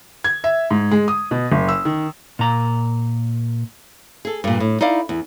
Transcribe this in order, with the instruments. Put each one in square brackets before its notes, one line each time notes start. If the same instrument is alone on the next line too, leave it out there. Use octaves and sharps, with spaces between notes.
[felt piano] G#6
E5
G#2
G#3
D#6
B2
F#1
E6
D#3
[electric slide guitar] A#2 A#5
[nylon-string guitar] G#4 A4
G2 A#2
A2
D#4 E4 D5 F5
E2